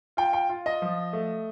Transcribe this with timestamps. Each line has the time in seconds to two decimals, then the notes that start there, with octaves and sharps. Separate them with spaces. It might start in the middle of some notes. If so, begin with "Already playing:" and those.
0.17 F4 G5
0.33 G5
0.49 F4
0.66 D#5
0.82 F3
1.13 A3